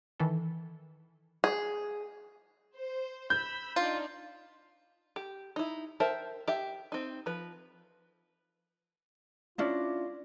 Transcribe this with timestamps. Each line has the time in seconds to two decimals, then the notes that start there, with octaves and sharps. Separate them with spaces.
0.20 D#3 E3 A4
1.44 G#4
2.76 C5
3.30 B5 E6 G6
3.76 D4 D#4 F4 D5
5.16 G4
5.56 D#4 E4
6.00 A#4 C5 E5 G5 A5
6.48 G4 E5 G5
6.92 C4 D#4
7.26 F3 B4
9.58 C#4 D4 E4 F4 D5 A#6